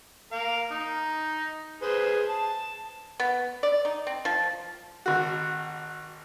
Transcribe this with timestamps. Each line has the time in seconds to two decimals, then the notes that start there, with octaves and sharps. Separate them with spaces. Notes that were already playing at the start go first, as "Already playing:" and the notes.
0.32 A#4 F5
0.71 D#4
1.82 G#4 B4 C5
2.29 A5
3.20 B3
3.63 D5
3.85 D#4
4.07 C4
4.25 F3
5.06 G#1 F#4